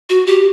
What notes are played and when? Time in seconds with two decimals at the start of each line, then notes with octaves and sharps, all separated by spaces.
0.10 F#4
0.27 G4